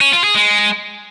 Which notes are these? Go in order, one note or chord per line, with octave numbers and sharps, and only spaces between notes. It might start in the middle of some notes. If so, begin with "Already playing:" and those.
C#4
F4
G#4
G#3